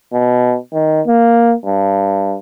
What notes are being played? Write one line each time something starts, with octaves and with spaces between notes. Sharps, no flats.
B2
D#3
A#3
G2